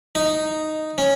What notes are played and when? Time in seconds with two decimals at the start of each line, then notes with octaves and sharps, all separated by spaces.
0.15 D#4
0.98 C#4